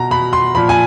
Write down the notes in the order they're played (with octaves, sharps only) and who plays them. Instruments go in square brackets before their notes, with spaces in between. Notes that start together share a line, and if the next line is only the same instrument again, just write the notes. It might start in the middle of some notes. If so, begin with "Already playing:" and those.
Already playing: [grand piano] B2 A#5
B2 B5
C6
A#2 F3 B5
G#5